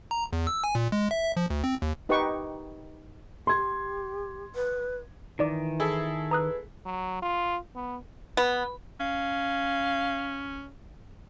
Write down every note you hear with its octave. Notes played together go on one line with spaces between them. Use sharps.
A#5
E2
E6
G#5
A#2
G#3
E5
E5
F3
D2
C4
D#2
D#4 G4 B4 D#5 G5 C#6
G4 C6 G#6
B4
D#3 E3 D#4 D5 D6
E4 G#4 A4
B4 A#5 D#6 F#6
F#3
F4
B3
B3
C#4 F5